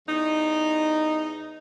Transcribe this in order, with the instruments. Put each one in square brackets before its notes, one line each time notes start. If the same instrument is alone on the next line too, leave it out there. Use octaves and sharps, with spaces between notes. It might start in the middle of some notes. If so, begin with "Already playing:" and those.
[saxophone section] E2 D#4